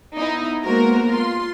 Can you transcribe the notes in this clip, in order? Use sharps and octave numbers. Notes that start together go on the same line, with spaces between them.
B3 D#4 E4
G#3 A#3 B3 F#4 A#4 C5
F4 C6